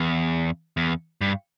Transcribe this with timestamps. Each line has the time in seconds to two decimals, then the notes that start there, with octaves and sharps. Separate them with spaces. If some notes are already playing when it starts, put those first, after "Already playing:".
Already playing: E2
0.77 E2
1.21 G2